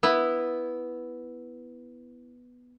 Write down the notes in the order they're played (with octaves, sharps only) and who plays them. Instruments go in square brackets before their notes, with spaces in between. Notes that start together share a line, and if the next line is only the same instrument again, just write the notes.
[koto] B3 E4